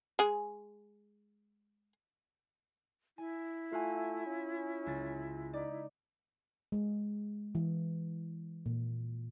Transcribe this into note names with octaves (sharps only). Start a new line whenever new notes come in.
G#3 G#4
E4 G#5
A3 F4 F5 F#5 G#5
C#4
C#2 A6
D#4 D5
G#3
E3
A#2